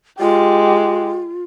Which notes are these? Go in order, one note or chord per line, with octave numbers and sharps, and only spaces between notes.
G#3 F4 G4